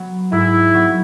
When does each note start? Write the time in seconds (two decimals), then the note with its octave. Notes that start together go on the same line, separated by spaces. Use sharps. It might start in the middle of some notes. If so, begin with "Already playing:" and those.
Already playing: F#3 B3
0.32 G#2 E4
0.74 F#3 B3